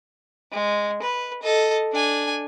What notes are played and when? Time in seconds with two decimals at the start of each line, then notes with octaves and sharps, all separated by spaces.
0.52 G#3
1.02 B4
1.43 A4 D#5
1.92 D4 G#5